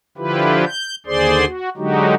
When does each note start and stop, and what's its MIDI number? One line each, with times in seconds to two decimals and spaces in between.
0.18 0.65 50
0.18 0.65 53
0.18 0.65 64
0.18 0.65 65
0.18 0.65 67
0.18 0.65 71
0.66 0.96 91
1.06 1.45 39
1.06 1.45 50
1.06 1.45 68
1.06 1.45 72
1.06 1.45 74
1.06 1.45 84
1.46 1.69 66
1.77 2.15 50
1.77 2.15 54
1.77 2.15 56
1.77 2.15 63
1.77 2.15 66
1.77 2.15 67